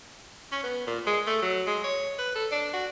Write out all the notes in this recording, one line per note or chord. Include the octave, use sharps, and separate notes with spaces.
C#4
B3
A#2
G#3
A3
F#3
G#3
C#5
B4
A4
D4
F#4